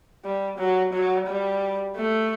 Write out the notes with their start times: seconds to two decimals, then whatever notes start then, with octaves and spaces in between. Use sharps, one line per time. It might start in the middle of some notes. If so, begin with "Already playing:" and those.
0.25 G3
0.58 F#3
0.93 F#3
1.28 G3
1.96 A3